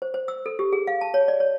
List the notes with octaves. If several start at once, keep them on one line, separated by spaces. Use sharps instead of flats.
C5
C5
E6
A4
G4
G#4
F5
A5
C#5
D5
C#5